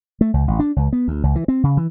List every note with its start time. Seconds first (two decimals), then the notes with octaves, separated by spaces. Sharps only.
0.21 A3
0.34 C#2
0.48 A1
0.59 D4
0.76 C#2
0.93 B3
1.08 D2
1.23 C#2
1.35 E3
1.48 C4
1.63 C#3
1.77 E3